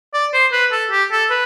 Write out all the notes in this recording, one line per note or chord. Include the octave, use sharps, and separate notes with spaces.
D5
C5
B4
A4
G4
A4
B4